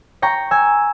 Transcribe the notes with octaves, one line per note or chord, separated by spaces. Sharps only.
G5 A#5 C#6
G#5 E6